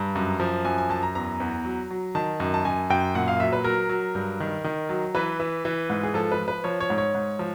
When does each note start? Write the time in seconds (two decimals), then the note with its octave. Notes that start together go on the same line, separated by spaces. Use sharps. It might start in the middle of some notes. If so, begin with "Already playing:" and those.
Already playing: G2 A#5
0.15 F#2
0.40 F3
0.65 F#2 G#5
0.78 G#5
0.90 F#2 A5
1.03 A#5
1.15 E2 A#5
1.40 E2
1.65 F#3
1.91 F#3
2.15 D#3 A5
2.40 F#2
2.54 A5
2.65 F#2 G#5
2.90 F#2 G5
3.15 A#2 F#5
3.28 F5
3.40 F#3 E5
3.53 B4
3.64 F#3 A#4
3.89 F#3
4.15 G2
4.40 D#3
4.64 D#3
4.89 F#3
5.15 E3 B4
5.40 E3
5.65 E3
5.90 G#2
6.03 G#4
6.14 F3 A4
6.32 B4
6.39 F3
6.48 B4
6.64 F3 C#5
6.80 C#5
6.90 G#2
6.98 C#5
7.15 G#2
7.39 F3